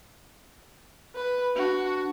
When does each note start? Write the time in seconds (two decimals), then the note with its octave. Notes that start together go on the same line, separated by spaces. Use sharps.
1.15 B4
1.56 D4 F#4